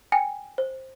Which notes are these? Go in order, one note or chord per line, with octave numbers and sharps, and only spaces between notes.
G5 G#5
C5